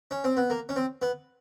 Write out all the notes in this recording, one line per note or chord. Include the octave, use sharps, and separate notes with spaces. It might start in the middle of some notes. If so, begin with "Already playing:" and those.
C#4
C4
B3
A#3
C#4
C4
B3